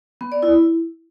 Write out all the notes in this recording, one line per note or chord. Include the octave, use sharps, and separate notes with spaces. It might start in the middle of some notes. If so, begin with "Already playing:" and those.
B3
D5
E4